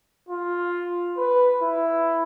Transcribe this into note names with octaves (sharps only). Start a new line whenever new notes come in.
F4
B4
E4